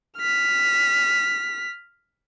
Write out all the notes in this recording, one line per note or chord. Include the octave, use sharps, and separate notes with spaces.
F6 B6